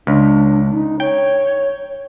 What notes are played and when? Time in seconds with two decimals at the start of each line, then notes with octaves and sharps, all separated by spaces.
0.07 C#2 D4
0.71 D#4
1.00 C#5 G5